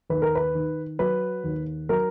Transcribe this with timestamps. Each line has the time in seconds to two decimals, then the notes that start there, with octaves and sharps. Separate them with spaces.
0.10 D#2 B4
0.22 A#4
0.35 B4
0.55 D#3
0.99 F#3 B4
1.44 D#2
1.89 F#3 A#4